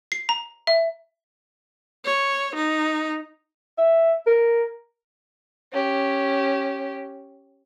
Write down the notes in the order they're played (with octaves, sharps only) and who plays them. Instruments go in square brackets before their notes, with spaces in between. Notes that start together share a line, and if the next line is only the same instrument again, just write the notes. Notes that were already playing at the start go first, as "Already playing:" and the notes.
[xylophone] C7
A#5
E5
[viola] C#5
D#4
[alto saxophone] E5
A#4
[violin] C#4 G4